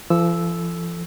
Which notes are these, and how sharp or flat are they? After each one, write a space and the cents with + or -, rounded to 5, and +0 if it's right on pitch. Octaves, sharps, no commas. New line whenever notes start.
F3 -40 A4 +0 E6 +0